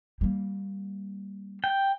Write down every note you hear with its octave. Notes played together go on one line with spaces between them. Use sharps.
G3 A#3
G5